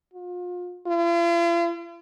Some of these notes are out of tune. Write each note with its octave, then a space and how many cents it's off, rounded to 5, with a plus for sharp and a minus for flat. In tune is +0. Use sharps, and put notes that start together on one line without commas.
F4 +35
F4 -45